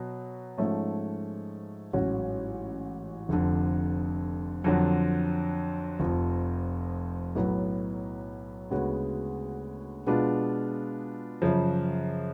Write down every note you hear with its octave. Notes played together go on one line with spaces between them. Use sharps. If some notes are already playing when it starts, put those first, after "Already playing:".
Already playing: B2 F#3
G#2 F3 A3 C#4
A1 G#2 F#3 C#4 F#4
F1 F2 D3
F2 D3 F#3
F1 F2 F3
B1 A2 F#3 B3
D2 C#3 G#3 B3 F#4
B2 G#3 B3 D4 F4
F#2 C#3 F3